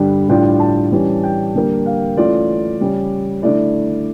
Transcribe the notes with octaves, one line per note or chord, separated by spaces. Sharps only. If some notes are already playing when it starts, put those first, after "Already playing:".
Already playing: G2 D3 G3 D4
A2 G3 D4 F4 G5
A5
E3 G3 C#4
G5
D3 G3 A#3
F5
E3 A3 C#4 F4 D5
C#3 G3 C#4
D3 A3 E4 D5